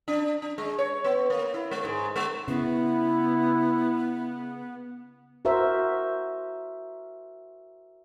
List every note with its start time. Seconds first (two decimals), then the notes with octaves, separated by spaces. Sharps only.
0.08 D4
0.42 D4
0.58 G#3
0.79 C#5
1.04 B3
1.30 A#3
1.54 E4
1.71 G#3
1.85 G#2
2.16 G#3
2.48 C#3 B3 E4
5.45 F#4 A#4 C5 E5